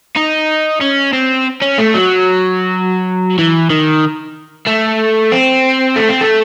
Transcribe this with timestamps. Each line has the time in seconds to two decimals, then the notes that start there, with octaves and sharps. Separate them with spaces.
0.16 D#4
0.81 C#4
1.13 C4
1.62 C#4
1.78 A3
1.94 F#3
3.39 E3
3.70 D#3
4.67 A3
5.32 C4
5.96 A3
6.09 C4
6.21 A3